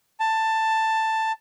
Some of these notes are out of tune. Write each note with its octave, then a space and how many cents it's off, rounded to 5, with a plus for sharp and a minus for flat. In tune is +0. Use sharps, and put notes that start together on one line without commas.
A5 +10